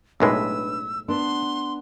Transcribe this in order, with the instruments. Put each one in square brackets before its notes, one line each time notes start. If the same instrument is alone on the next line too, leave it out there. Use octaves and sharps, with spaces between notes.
[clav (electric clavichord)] B1 A2 G#3 [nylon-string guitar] D4 B4 [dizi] E6
[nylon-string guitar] B3 D4 [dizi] C6